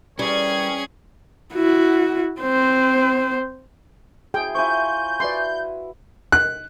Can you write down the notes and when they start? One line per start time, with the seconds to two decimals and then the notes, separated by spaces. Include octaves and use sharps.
0.19 E3 G3 C#4 G#4 A#4 C#5 G#6
1.54 E4 F#4
2.41 C4 C5
4.34 E4 F#4 G#4 G5
4.55 E4 F4 C5 G#5 C#6 G6
5.20 E4 F#4 B4 D5 C6
6.32 F#6